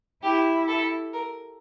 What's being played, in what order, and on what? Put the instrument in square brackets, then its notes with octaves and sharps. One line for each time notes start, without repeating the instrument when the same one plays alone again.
[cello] E4 [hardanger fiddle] G4
[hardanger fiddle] A4
A#4